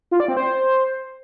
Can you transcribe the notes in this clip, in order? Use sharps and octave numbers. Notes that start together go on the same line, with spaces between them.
F4
D5
C4
C5